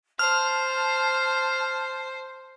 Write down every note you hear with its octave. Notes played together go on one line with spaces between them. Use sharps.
C5 A5 F6